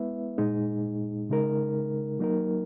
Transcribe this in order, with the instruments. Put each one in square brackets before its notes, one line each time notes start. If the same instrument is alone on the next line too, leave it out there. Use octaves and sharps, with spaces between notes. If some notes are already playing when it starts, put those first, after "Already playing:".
Already playing: [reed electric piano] G#3 B3 E4 B4 E5
A#2 G#3 D#4 G#4
C#3 G#3 D#4 A#4
F#3 A#3 D#4 A#4